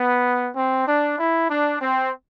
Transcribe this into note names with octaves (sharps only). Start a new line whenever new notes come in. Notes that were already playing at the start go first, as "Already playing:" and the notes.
Already playing: B3
C4
D4
E4
D4
C4